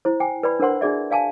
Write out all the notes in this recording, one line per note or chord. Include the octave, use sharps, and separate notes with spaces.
E4 C5
G5 G#5
B4 D5 B5
D4 A#4 C5 F#5 C6
D4 F#4 G#4 D5 E5
D5 F5 G#5 A5